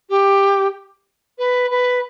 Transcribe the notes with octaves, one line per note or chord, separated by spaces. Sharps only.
G4
B4
B4